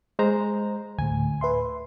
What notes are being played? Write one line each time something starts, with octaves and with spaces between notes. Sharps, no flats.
G#3 C5 A#5
D2 A2 G#5
B4 E5 C6